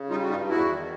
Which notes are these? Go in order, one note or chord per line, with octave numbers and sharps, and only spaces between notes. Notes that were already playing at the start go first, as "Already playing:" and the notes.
Already playing: C#3
G3 D#4 F4
F#4
G2 D#4 F4
E2 E4 F#4
D#3